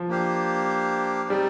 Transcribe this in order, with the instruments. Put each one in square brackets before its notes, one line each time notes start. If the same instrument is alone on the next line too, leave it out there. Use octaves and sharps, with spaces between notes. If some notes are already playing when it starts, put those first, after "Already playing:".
Already playing: [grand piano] F3
[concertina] A#3 D4 G4 C5 F5
[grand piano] G3 [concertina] C4 D#4 G4 D5